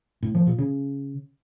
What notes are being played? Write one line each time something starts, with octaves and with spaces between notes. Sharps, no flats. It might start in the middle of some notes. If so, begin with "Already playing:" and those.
A2
F3
A#2
C#3